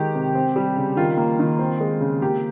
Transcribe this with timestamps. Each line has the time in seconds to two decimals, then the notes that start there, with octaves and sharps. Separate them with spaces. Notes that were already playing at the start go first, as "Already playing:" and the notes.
Already playing: D#3 G#3 G4
0.15 C3
0.35 C4
0.56 G3
0.77 C#3
0.97 D#3 F4
1.17 A#3
1.39 D#3
1.59 C4
1.80 G#3
2.01 C#3
2.22 A#3 G4